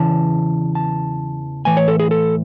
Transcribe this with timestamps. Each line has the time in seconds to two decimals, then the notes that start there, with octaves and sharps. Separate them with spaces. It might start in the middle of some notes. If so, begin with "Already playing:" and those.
Already playing: E2 C#3 E3 A5
0.75 A5
1.65 A2 E3 G#5
1.77 C#5
1.88 A4
2.00 G#4
2.11 A4